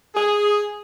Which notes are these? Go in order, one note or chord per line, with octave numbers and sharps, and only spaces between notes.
G#4